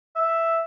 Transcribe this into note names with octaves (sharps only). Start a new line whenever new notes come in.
E5